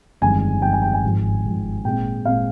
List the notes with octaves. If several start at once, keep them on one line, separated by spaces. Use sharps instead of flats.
G1 F2 D#3 G#3 G#5
G1 F2 D#3 G#3 G5
G#5
G5
G#5
G#1 G#2 F3
G#1 G#2 F3
A#2 G#3 C4 G5
A#2 G#3 C4 F5